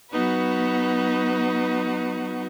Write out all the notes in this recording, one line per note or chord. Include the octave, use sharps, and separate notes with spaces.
F#3 B3 D#4 F#4 B4